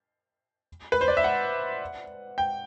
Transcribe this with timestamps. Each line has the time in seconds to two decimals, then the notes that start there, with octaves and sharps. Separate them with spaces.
0.92 B4
1.01 C5
1.08 D5
1.17 E5
1.24 F#5
2.38 G5